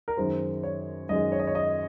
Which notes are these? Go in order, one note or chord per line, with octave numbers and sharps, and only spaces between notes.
A#4
F#2 D#3 G#3 C5
C#5
F#2 D#3 G#3 D#5
C#5
D#5
C#5
D#5